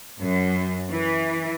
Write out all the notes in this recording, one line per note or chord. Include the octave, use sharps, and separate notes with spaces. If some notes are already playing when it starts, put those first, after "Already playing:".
F#2
E3